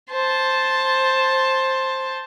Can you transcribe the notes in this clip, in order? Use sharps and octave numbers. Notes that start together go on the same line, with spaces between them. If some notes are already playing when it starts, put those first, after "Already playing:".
C5 A5